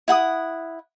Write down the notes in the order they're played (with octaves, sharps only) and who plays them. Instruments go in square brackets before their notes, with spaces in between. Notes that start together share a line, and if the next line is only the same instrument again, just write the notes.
[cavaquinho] E4 F#5 G#5 D#6